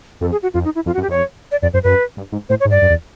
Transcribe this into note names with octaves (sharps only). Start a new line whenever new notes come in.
F2 A4
G#4
F#4
F2 F4
D#4
E4
F2 F4
F#4
F#2
G4
F2 C#5
D5
F2 D5
F#2 C5
F#2 B4
G2
G#2
A2 C5
C#5
G#2
G2 D5
F#2
E2